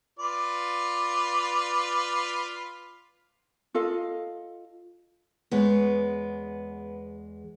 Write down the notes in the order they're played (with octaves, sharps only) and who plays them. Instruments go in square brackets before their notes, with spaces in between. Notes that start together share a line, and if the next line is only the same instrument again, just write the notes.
[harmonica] F4 B4 D5
[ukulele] F4 A4 D#5 F5
[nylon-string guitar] E2 G#3 C#5 [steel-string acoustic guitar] B3